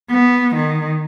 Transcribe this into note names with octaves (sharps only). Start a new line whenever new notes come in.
B3
D#3